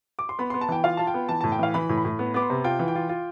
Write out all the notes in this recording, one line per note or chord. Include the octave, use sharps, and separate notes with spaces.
D6
C6
B3 B5
B3 C6
A5
E3 G5
F4 F5
F4 A5
G5
B3
E3 A5
A2 A5
G5
E3 F5
E3 B5
A2
B5
A2
B3
B3 D6
C6
C3
F4 G5
E3
G5
F4
F4